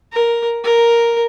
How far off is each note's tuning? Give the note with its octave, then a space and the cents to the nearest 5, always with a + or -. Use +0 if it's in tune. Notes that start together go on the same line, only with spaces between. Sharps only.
A#4 +5
A#4 +0